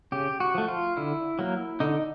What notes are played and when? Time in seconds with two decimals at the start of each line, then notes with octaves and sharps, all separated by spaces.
0.12 C#3 G4
0.40 F#4
0.54 F3 A3
0.68 F4
0.97 D3 E4
1.39 F#3 A#3
1.80 D3 D#4